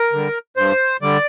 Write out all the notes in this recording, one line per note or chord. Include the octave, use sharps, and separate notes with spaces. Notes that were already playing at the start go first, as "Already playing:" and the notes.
Already playing: A#4
D3 G3
G2 C5
D3 G3 D5